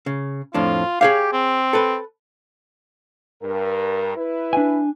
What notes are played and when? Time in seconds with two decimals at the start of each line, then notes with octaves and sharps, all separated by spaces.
0.06 C#3
0.54 F2 A2 D4 F4
1.01 G4 G#4 C#5 F5
1.33 C4
1.73 A4 B4
3.42 G2 A#4
4.16 E4 B4
4.53 D4 G#5